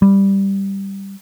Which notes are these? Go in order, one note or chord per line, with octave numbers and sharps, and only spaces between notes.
G3